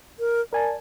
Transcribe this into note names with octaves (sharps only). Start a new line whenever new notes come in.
A#4
A#4 D5 G#5 A5